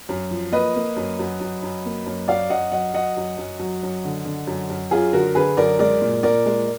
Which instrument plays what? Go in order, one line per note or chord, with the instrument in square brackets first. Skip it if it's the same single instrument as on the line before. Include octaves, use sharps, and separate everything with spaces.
[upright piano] F#2
F3
A#3 B4 D#5
A#3
F#2
F#2
F#2
F#2
A#3
F#2
F#2 D5 F5
F#2 D#5 F#5
F#3 D#5 F#5
F#3 D#5 F#5
F#2
F#2
F#3
F#2
D3
D3
F#2
F#2
F#2 F4 G#4
D3 F#4 A#4
D3 G#4 B4
F#2 A#4 D5
G#3 A#4 D5
A#2
A#2 A#4 D5
G#3